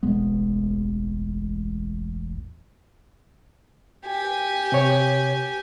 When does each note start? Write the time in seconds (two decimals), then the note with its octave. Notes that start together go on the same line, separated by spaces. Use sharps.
0.03 E1 A1 G#3 B3
4.05 G4 G#5
4.72 C3 C#5